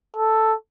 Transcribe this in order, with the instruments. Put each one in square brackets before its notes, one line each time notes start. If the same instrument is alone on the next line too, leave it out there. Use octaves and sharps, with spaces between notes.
[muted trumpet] A4